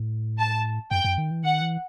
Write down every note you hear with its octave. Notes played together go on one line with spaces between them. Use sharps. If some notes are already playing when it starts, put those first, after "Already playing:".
Already playing: A2
A5
F#2 G5
F#2
D#3
E3
D#3 F#5
E3